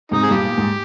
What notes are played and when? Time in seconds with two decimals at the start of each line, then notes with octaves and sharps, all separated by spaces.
0.11 G#2 C3 D#4
0.23 G#4
0.31 G2 A#2 G4
0.49 A#2
0.58 G#2